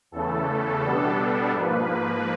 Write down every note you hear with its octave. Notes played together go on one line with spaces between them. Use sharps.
E2 C#3 E3 A3 A4
B2 G3 B3 D4
G#2 F3 A#3 B4